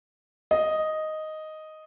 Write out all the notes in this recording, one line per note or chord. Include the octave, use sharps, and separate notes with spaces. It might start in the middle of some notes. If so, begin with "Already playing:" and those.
D#5